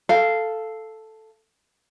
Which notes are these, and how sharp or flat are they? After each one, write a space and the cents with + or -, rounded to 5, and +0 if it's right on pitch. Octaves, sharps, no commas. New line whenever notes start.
A4 +0 F5 -10